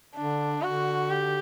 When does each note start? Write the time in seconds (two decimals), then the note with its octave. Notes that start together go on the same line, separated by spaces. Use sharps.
0.16 D3 D4
0.63 D3 F#4
1.10 G4